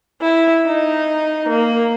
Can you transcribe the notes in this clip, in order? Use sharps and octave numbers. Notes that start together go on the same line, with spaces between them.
E4
D#4
A#3